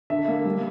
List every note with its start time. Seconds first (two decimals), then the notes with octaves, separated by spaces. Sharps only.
0.10 D3 E5
0.28 A#3
0.45 G3